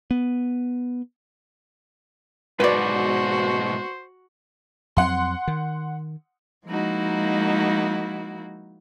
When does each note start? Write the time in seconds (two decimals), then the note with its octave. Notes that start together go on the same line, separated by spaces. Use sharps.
0.11 B3
2.60 G#2 B2 F#4 B4 C5 D5
4.97 F2 F#3 C4 F#5 C6
5.48 D#3
6.66 F3 G#3 A#3 D#4 E4 F#4